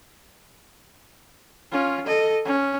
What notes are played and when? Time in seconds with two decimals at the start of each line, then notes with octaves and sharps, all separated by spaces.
1.71 C#4 F4
2.07 A4 D#5
2.45 C#4